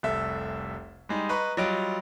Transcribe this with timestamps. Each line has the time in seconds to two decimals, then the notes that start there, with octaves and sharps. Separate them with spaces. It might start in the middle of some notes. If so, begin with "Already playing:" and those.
0.03 F1 C2 A4 E5
1.09 G3 G#3 D#4
1.29 B4 D#5 A#5 B5 C#6
1.57 F#3 G3 F4 D#5 G5 D7